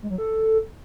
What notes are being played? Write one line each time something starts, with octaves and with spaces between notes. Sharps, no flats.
G#3
F#3
A4